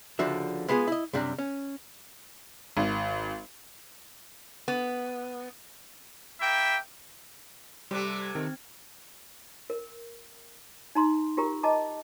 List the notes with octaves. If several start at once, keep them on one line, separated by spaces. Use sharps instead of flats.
C#2 D3 F3 D4 F#4 E5
G#3 B3 F4 G4 G#4
E4 D#5
F#2 C3 G3 D4
C#4
G#1
B3
A#3 E4 E5 G5
C3 G3 A3 C6 D6 F#6
G#6
D#3 C4
A#4
D#4 A#5 C6
F4 G4 A#4 A#5
D#5 A5 A#5 D6